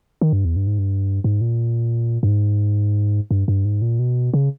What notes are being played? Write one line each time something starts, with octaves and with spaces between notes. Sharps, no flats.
D#3
G2
E2
G2
G#2
G2
G#2
A#2
G2
G#2
G2
G2
G#2
A#2
B2
C#3